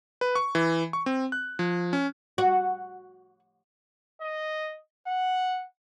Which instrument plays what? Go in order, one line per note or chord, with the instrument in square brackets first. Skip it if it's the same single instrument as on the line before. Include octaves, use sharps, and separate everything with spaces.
[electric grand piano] B4
C#6
E3
C#6
C4
F#6
F3
C#4
[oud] F#4
[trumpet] D#5
F#5